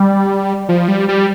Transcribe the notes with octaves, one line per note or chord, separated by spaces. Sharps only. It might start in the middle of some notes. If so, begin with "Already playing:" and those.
Already playing: G3
F3
G3
G3